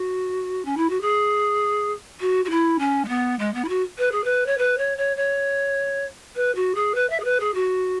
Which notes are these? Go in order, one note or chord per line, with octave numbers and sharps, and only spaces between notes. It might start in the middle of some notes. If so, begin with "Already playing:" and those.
Already playing: F#4
C#4
E4
F#4
G#4
F#4
F#4
E4
C#4
G#3
B3
G#3
B3
E4
F#4
B4
G#4
B4
C#5
B4
C#5
C#5
C#5
B4
F#4
G#4
B4
E5
G#4
B4
G#4
F#4